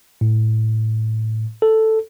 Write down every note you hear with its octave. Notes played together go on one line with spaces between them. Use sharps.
A2
A4